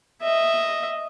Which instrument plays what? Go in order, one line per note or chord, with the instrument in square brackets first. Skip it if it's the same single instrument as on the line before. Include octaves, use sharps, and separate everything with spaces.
[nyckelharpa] D#5 E5